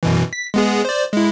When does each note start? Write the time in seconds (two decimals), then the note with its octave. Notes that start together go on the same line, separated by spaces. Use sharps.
0.03 F#2 B2 E3
0.33 B6
0.54 G#3 B3 G#4
0.85 C5 D5
1.13 G#3 E4